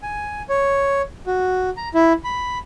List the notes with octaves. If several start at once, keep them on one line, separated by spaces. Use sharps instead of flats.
G#5
C#5
F#4
A#5
E4
B5